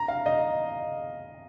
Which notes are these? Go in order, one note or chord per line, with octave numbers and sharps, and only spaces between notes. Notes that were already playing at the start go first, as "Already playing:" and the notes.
Already playing: A#5
F5
D#5